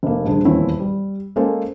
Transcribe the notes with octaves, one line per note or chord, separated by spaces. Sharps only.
F1 A#3
D#1 D3 G#4
D#1 E2 A#2 C4 E4 C#5
G3
G#3 A#3 C#4 A4 C5